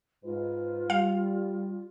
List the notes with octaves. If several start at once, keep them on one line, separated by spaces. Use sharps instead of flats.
G#2 F4 B4
G3 F5